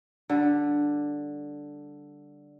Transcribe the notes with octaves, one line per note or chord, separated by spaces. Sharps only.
D3 G3